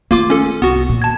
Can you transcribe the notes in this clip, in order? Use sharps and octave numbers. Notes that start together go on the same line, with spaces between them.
D#3 A3 A#3 F4 D6
C#4 A4
C2 B3 F#4
A#2
A5 G#6